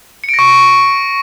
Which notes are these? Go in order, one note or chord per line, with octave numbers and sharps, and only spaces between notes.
C#7
D7
A#6
C#6